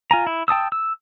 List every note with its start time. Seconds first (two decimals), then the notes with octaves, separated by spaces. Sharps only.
0.11 F4 G#5 A#5
0.27 E4
0.48 G5 A5 D#6 E6
0.72 E6